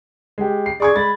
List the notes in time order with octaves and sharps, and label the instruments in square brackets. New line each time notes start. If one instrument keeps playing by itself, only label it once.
[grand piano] G#3 G4
C7
[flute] G#4 [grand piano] D5 C#6 G#6
[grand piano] G#3 A6 [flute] B5